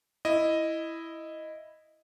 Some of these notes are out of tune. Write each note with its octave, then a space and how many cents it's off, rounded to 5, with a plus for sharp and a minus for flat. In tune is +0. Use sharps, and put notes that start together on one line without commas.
E4 +0 D#5 +0